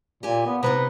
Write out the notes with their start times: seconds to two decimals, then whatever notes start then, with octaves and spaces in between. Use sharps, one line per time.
0.23 A#2 G4 G#5
0.46 B3
0.63 C3 B3 D#4 B4